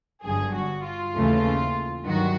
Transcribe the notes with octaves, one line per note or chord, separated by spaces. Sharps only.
G1 G2 D3 F#3 G#4
F#4
F4
D#2 C#3 E3 A3
G2 D#3 F#3 F#4